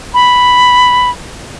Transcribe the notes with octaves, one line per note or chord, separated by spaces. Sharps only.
B5